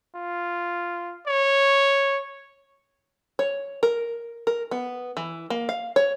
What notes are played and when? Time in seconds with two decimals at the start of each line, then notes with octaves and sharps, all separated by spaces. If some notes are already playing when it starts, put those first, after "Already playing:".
0.15 F4
1.27 C#5
3.39 C#5
3.83 A#4
4.47 A#4
4.71 B3
5.17 E3
5.50 A#3
5.69 F5
5.96 C#5